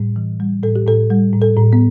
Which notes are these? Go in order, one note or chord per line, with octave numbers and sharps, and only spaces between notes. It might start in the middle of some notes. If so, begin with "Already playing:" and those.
Already playing: A2 G3
E3
G3
A2 A4
G4
A2 A4
G3
A2
A4
A2
B3